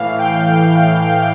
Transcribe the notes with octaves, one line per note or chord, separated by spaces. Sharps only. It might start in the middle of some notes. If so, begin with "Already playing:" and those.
Already playing: A2 E3 F5
G5